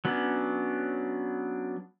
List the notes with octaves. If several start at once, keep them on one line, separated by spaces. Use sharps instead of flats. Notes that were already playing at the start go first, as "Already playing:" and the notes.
F#3 B3 C#4 D4